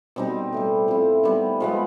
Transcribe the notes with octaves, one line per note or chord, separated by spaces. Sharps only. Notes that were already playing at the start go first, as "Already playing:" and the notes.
B2 G3 C4 D#4
A2 E3 G3
F3 A3 C4 E4
D#3 G3 B3
F3 G#3 B3